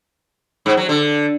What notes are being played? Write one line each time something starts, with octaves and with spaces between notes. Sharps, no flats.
G#2
F#3
D3